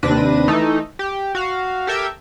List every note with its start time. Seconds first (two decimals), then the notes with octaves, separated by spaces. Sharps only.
0.03 D#2 C3 D4 B4 A#6 D#7
0.48 E3 A3 D#4 A4
0.99 G4
1.35 F#4 F5
1.87 G4 A4 A#4 E5 G5 G#6